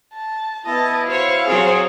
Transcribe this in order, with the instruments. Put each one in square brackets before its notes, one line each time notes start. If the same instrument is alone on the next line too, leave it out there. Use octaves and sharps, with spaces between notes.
[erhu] A5
[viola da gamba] B3 [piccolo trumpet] E4 [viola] D#5 [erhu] A5
[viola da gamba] F#4 C#5 [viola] C5 [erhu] F5
[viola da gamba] F#3 C4 A4 [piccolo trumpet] G#4 [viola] C5 C#5